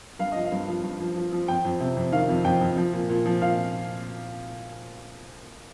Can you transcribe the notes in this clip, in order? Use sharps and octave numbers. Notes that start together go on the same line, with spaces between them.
G2 F5
F3 D#5
F5
G2
F3
G2
F3
F3
F3
F2 G5
F2
C3
F2
D#3 F5
F2
F2 G5
F2
F3
A#2
A#2
F3
A#2 F5